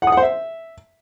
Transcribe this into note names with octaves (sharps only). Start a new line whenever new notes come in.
F#5
D#6
F#5
C5
E5